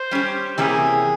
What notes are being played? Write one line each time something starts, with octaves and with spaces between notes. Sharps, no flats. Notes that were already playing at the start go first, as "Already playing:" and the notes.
Already playing: C5
G3 C#4 G4
C3 E3 A#3 C#4 G4 G#4